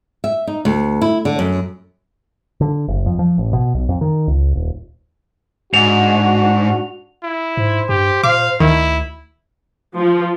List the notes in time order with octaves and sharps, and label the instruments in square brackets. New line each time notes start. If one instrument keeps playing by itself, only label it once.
[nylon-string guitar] E5
D#4
D2
E4
D3
F#2
[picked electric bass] D3
F#1
F2
F3
A1
B2
B1
F2
D#3
C#2
D#1
[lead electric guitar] G#2 [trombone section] D4 F#4 [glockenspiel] F7
[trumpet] E4
[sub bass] G#2 [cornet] C5
[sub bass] G2 [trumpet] G4
[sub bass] A#2 [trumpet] F5 [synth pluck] D6
[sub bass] D2 [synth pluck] D#3 [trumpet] E4
[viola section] F3